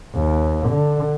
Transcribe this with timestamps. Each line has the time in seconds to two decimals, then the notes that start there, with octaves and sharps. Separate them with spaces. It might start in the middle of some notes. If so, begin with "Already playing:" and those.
0.15 D#2
0.69 D3